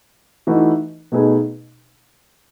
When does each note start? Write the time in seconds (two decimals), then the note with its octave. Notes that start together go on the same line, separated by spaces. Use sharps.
0.47 E3 A3 D#4 F#4 B4
1.12 B2 A3 D#4 G#4 B4